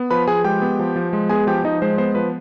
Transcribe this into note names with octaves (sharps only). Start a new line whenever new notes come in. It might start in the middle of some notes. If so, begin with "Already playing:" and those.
Already playing: B3
F3 B4 B5
F3 G#4 G#5
G#3 G4 G5
B3
F3
F3
G#3
B3 G#4 G#5
F3 G4 G5
F3 D#4 D#5
G#3 C5
B3 C5
F3 B4